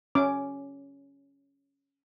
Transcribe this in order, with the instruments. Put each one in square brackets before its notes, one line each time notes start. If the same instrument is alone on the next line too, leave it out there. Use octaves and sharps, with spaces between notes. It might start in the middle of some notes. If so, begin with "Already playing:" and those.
[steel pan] C#4 D6